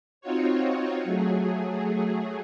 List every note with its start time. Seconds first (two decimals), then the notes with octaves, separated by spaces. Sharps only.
0.21 C4 D#4 F4 F#4 C#5
1.04 F#3 A3 G#4